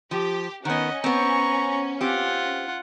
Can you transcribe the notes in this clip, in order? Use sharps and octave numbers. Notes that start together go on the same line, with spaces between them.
F3 G4
D#3 B3 C#4 D#5 F#5
B3 C4 A#5 C#6
C4 F4 G4 F#5